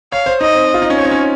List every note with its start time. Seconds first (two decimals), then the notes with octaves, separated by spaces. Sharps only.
0.12 C#5 F5
0.26 C5
0.41 D#4 D#5
0.55 C4
0.74 F4
0.82 D#4
0.90 C#4
0.97 C4 C#5
1.05 D#4
1.11 C#4